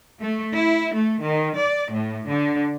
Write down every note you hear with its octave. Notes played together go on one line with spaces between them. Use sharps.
A3
E4
A3
D#3
D5
A2
D3